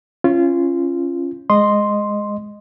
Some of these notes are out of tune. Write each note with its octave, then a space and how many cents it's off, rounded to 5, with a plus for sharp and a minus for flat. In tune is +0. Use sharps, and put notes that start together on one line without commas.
C#4 -15 F4 -25
G#3 +0 D#5 -10 C6 +0